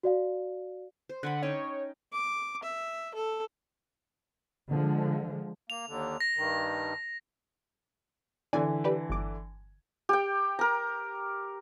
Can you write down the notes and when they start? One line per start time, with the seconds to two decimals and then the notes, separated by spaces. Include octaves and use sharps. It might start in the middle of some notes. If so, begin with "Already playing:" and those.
0.03 F#4 D5 F5
1.09 C5
1.23 D3 F#5 G#5 B5
1.43 C#4 D#4 C#5 G5
2.12 D6
2.63 E5
3.15 A4
4.70 D3 F3 G#3
5.70 A#3 F7
5.88 D#2 D3
6.21 A#6
6.36 G2 D#3
8.53 D3 E3 D5 G#5
8.84 G4 B4 D5
9.10 G1 D6
10.09 G4 G5
10.59 A#4 A#5